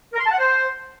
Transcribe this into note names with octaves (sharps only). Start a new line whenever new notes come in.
A#4
C6
A5
F#5
C5